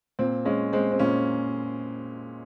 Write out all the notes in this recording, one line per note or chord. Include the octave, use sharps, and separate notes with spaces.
A#2 C4
G#3 C#4
G#3 C4
C4
A#2 C#4